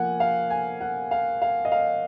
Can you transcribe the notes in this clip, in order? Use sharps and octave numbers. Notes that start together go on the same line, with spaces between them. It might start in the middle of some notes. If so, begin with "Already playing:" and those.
Already playing: F3 A#3 F#5 G#5
F5
G#5
F#5
F5
F5
D#5
F5